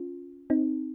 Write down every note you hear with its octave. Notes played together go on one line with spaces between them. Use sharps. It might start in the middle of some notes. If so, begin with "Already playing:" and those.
Already playing: C#4 F4
C4 D#4